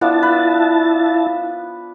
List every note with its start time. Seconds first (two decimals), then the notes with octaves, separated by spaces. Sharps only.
0.01 F3 B3 D4 E4 A5
0.23 B4